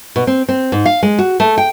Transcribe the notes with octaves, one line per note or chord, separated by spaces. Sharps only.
B2
C4
C4
G#2
F5
G#3
F#4
A3
G5